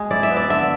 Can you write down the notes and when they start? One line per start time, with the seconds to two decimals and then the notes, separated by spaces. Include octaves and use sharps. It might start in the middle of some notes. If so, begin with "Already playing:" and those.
Already playing: G#3
0.11 E4 D5
0.23 E5
0.31 B3
0.37 D5
0.50 D3 E5